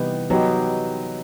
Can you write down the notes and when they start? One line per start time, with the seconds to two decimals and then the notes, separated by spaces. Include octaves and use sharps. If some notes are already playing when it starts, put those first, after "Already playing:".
Already playing: C3 E3 G3 B3 D#4 G4
0.30 F#3 B3 D#4 G4 B4